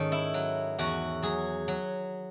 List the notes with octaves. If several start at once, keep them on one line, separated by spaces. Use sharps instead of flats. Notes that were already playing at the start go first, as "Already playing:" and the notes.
Already playing: G#2 D#3 C#4 A4
E4
F#3
E2 F#4
F#3 G#4
F#3